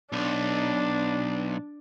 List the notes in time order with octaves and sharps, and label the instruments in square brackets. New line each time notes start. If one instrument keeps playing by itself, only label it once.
[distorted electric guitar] B1 [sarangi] D4